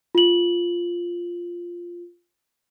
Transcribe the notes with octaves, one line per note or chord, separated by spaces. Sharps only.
F4 F#7